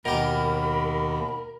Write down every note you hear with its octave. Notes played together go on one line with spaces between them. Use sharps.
D#2 B2 G4 A#4 B5